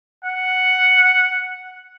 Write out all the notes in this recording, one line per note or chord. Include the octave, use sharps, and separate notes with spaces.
F#5